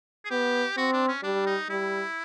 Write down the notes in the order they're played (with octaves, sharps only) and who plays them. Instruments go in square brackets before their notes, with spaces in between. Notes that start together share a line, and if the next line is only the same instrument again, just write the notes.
[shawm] G#4
[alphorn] B3 [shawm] G4
[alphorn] C4 [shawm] F#4
[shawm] D4
C#4
[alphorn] G3 [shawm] D4
[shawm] D#4
[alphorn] G3 [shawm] E4